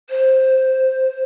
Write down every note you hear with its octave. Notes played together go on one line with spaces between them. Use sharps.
C5